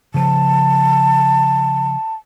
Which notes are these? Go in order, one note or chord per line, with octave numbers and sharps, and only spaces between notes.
C#3 F3 A5